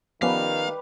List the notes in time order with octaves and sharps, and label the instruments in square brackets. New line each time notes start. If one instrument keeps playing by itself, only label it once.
[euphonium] D#3 [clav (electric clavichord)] F3 B3 C#4 [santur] G3 G4 B4 [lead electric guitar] F5